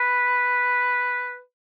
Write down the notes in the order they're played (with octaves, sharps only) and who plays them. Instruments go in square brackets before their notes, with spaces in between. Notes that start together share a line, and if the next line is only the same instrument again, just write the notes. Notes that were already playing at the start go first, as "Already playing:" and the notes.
Already playing: [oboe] B4